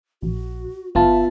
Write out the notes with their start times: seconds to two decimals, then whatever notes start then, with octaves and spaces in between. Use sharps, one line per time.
0.22 A#1 F#4
0.95 G1 B3 F4 E5 A5